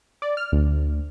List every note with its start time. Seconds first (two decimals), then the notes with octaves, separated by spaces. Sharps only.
0.22 D5
0.37 F6
0.52 D2